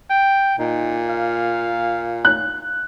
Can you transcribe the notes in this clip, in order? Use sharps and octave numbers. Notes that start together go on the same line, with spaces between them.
G5
A#2 D#4
F5
F#6